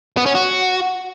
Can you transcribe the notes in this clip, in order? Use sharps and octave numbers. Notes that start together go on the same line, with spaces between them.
B3
C#4
F#4